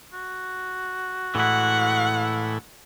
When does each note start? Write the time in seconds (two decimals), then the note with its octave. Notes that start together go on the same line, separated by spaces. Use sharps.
0.13 F#4
1.35 A2 E3 G#3 E4 F#5